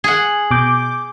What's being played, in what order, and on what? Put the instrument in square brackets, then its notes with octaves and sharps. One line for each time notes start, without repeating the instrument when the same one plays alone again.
[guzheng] G#4 F#5
[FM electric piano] B2 D6 G6